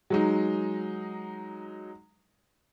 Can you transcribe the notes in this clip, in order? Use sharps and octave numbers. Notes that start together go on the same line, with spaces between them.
F#3 G#3 D#4